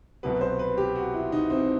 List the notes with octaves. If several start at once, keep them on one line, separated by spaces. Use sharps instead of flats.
C2 B2 F#3 B4
C5
B4
G4
F#4
E4
D#4
C4